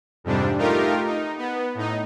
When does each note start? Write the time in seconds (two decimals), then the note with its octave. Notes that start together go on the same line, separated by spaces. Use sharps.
0.24 F2 G#2 C3 G3 D4
0.58 A3 D#4 F4 G4 A#4
1.07 D#4
1.38 B3
1.75 A2 D#4